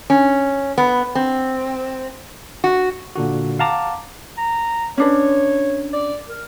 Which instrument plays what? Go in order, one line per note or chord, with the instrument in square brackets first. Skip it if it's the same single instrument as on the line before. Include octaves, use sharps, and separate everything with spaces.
[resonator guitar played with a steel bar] C#4
B3
C4
F#4
[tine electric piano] A#2 D3 F#4
F5 F#5 A5 A#5 D6
[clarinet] A#5
[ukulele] C#4 D4 B4 [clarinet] C#5
[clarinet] D5
A#4